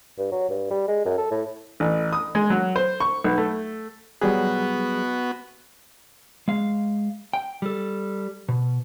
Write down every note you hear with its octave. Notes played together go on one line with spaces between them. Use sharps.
G2
F#3
G2
G3
G#3
F#2
A4
A2
A1
D#6
G#3
F#3
C5
C#6
B1
A3
F#3 G3 B3 F#4 G#4
G#3 F5
G5
G3 A4
B2